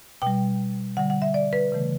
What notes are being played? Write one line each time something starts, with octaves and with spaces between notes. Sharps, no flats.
B2 G3 G5
D3 G3 F#5
F#5
E5
D5
B4
C#3 E3 A3